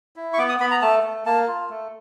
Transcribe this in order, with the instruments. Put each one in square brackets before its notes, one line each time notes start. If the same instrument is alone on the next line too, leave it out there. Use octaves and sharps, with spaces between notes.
[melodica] E4
C#6
B3 D6
D#6
B3 B5
A#5
A3 A5
A3
A#3 A5
F4
A3